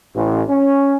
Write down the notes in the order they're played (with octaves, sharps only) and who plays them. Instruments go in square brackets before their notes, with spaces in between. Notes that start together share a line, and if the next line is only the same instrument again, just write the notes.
[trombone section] A1
C#4